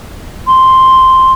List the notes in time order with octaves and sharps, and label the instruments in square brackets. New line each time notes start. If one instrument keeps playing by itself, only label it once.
[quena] C6